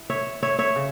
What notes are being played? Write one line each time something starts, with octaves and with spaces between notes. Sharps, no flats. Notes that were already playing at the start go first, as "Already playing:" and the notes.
Already playing: E4
C#5 E5
C#5 E5
C#5 E5
C#3